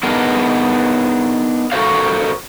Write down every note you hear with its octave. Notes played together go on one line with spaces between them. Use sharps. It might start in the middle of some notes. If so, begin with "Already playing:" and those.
B3 D4 D#4 G#4 A#4 B4
F#4 A4 A#4 C5 D5 F5